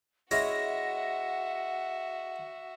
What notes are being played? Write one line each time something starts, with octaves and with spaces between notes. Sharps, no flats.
G#3 C#4 E4 F#4 E5 F#5 A#6